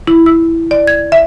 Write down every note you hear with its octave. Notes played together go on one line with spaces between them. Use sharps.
E4
E6
D5
G#6
E5